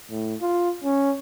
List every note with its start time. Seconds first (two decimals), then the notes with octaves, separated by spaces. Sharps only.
0.10 A2
0.41 F4
0.84 C#4